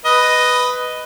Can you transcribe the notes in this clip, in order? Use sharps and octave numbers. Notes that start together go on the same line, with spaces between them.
B4 D#5